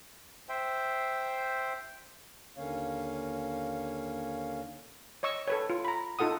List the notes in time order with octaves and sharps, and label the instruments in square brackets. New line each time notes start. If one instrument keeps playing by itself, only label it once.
[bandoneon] C5 E5 G5
[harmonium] D#2 D3 A#3 C#4 C#5 F5
[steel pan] C#5 D#5 C#6 E6
A4 B4 C#5
F4
A#5 B5
D#4 F4 A4 F#5 D#6